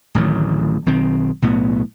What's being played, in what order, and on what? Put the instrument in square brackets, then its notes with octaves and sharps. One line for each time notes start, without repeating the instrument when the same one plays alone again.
[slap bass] D1 A1 D#3 F#3
B1 D#3 C4
B1 A2 B3